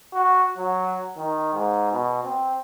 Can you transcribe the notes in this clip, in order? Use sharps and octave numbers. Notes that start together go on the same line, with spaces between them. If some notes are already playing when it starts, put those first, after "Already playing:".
F#4
F#3
D#3
G#2
B2
C4